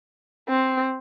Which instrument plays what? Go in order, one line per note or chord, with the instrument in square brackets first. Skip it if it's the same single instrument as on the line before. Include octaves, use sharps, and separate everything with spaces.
[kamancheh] C4